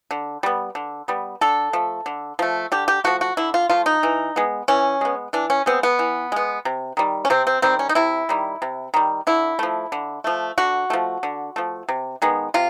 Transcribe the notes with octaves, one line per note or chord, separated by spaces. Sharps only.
D3
G3 B3
D3
G3 B3
D3 A4
F3 A3
D3
F3 A3
D3 G4
G4
F3 A3 F#4
F#4
D3 E4
F4
F3 A3 F4
D#4
E3
G#3 B3
E3 C#4
G#3 B3
E3 D4
C#4
G#3 B3 C4
B3
E3
G#3 B3
C3
D#3 G3
C#4
C3 C4
C4
D#3 G3 C4
C#4
D#4
C3 E4
D#3 G3
C3
D#3 G3
D3 E4
F3 A3
D3
F3 A3
D3 F#4
F3 A3
D3
F3 A3
C3
D#3 G#3 B3
C3 F4